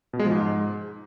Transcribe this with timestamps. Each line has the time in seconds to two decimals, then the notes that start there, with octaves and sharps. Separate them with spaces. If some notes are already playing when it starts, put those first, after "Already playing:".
0.13 B2
0.19 G#3
0.26 F3
0.32 G#2